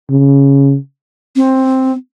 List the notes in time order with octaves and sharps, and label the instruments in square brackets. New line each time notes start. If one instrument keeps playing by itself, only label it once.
[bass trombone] C#3
[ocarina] C4